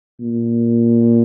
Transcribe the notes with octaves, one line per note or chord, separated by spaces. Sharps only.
A#2